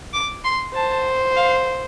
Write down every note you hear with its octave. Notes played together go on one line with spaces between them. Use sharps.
D6
C6
C5 A5
F5